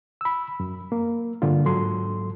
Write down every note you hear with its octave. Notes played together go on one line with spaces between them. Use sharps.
B5 E6
F#2
A#3
G2 D3 A#3 F4
G#2 F#3 A4 C6